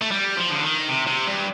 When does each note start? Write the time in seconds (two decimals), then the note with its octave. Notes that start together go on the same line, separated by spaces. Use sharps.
0.02 A3
0.11 G3
0.37 F3
0.51 D3
0.62 D#3
0.89 C3
1.07 C3
1.27 G2